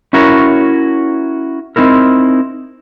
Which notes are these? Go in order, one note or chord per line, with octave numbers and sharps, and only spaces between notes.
C#4 E4 F#4 A#4 C#5
C4 D#4 E4 A#4